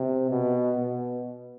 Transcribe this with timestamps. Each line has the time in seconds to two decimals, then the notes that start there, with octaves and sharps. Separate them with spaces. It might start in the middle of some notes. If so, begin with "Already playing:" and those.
Already playing: C3
0.30 B2
0.77 B2